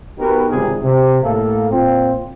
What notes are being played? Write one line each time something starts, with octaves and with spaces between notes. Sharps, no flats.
B3 D#4 F#4 G4 A#4 B4
G#1 C#2 G#2 C3 G3 G#4
C3
A2 A#3 A4
A#2 C4 F4